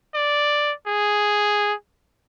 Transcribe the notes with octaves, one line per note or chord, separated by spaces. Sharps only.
D5
G#4